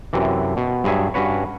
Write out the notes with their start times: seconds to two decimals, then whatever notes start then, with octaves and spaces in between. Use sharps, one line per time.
0.13 F#2 C3 E3
0.57 B2
0.84 G2 F#3 G#4 E5 G#5
1.14 G2 C#4 F#4 B4 C#5